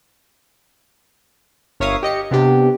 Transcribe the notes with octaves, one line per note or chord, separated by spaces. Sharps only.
G1 A#4 C#5 E5 F5 D#6
G4 D#5 C#7
C3 B3 D4 G4